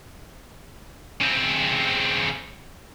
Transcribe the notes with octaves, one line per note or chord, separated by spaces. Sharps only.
C#3 C4